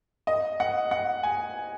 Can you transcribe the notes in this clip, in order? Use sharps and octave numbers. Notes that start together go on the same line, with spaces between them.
D#5
F#5
F#5
G#5